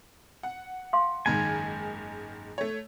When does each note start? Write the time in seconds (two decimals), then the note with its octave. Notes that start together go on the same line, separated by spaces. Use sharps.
0.43 F#5
0.93 F5 C6 D6
1.26 F#1 G#2 D#3 G#5
2.58 A3 C#5